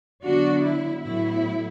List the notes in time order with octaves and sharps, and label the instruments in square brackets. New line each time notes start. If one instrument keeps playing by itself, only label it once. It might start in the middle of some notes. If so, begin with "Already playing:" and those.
[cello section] D3 F#3 B3 D4 F#4
E4
A2 F#3 B3 E4